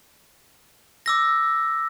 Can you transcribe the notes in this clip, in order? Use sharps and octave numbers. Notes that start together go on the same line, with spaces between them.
D6 E6 A#6